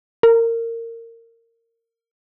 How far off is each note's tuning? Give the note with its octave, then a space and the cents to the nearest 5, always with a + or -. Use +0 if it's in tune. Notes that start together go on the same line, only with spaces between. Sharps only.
A#4 -25